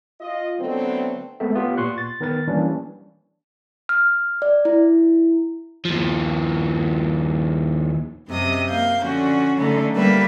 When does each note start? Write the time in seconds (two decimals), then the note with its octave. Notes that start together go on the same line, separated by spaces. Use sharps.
0.20 F4 D#5
0.60 D3 F#3 A3 B3 C4
1.40 G#3 A3 B3 C4 A4 E5
1.55 B3 F4 G4 C#5
1.77 A#2 C6 C#6 F#6
1.98 A6
2.20 D#3 B3 A#4 B4 A6
2.48 E3 F3 G3 A#3 C#4 D4
3.89 F6
4.42 D5
4.65 E4
5.85 D#2 F3
8.29 F#2 C3 D#5 D#6
8.69 A#3 F5 G6
9.04 D3 F3 C#4 F#4
9.57 D3 F#3 A3 C#4 D#4
9.95 G3 A#3 B4 E5